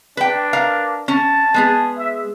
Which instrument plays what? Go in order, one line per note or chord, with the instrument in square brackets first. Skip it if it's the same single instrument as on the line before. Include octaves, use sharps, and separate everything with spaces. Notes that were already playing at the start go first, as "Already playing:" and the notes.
[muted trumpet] D4 [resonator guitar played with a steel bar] B4 G5
[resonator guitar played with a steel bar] A#4 F5
[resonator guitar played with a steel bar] C#4 [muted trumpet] A5
[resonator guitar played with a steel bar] G#3 B3 G#4
[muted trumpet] E5